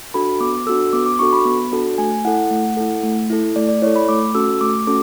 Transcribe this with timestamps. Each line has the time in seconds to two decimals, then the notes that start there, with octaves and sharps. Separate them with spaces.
0.14 D4 F#4 A4 B5
0.40 B3 D6
0.67 D4 F#4 A4 E6
0.93 B3 D6
1.06 D6
1.19 D4 F#4 A4 C#6
1.33 B5
1.45 B3
1.72 D4 F#4 A4
1.98 A3 G#5
2.25 E4 A4 F#5
2.51 A3
2.77 E4 A4
3.03 A3
3.30 E4 A4
3.56 A3 D5
3.69 D5
3.82 E4 C#5
3.87 A4
3.96 B5
4.09 A3 D6
4.35 C#4 F#4 A4 E6
4.61 A3 D6
4.87 C#4 F#4 A4 D6